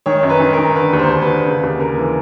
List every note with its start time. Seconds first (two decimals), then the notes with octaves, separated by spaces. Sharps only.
0.06 D#3 C#5
0.23 F#2
0.30 B4
0.40 D#3
0.53 A#4
0.58 D#3
0.76 D3 B4
0.93 D#2
0.99 C5
1.10 D#2
1.22 B4
1.27 D3
1.45 C#3 B4
1.63 D#2
1.80 C#3 A#4
1.98 E3